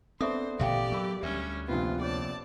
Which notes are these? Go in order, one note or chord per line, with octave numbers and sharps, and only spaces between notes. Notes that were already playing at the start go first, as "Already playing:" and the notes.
B3 C4 D4 G#4 A4 C5 E5 D#6
A1 A#2 D3 G4 D5 E5 F5 G5
F#3 G#4 A#4 B5
D2 G3 C#4 E5
A#1 C3 B3 F4
G#4 C#5 D5 A5